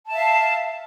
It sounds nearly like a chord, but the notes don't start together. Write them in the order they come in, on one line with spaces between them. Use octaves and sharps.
A5 E5 F5